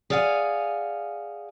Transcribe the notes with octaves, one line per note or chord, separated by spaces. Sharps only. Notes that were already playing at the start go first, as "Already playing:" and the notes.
G#4 D5 F5 F#5 G#5